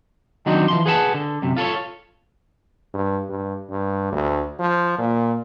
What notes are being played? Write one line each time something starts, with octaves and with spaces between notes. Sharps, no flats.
D#3 F#3 C4 D4 D#4
E3 F3 C6
G#4 B4 F#5 A5
D3
F#2 C3
F4 A4 A#4 C#5
G2
G2
G2
D2
F3
A#2